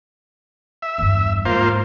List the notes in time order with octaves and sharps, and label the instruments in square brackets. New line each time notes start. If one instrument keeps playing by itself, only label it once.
[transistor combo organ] E5
[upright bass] E2 G2
[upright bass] G#2 [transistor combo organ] A#3 F4 C5